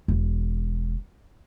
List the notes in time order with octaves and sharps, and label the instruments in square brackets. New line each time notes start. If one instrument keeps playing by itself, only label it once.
[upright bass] E1